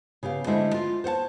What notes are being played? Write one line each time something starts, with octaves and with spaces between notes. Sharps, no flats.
C#3 B3 G4 F5
D3 G#3 A3 E4 C5 E5
F4
C5 C#5 F#5 A5